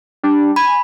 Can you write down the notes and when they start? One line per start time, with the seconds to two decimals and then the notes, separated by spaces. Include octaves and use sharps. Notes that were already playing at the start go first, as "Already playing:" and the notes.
0.23 G3 D4
0.56 G#5 B5